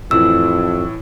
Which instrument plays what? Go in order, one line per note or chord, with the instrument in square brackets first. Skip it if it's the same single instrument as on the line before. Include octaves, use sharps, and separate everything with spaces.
[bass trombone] F2 [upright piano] A2 E3 [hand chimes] E6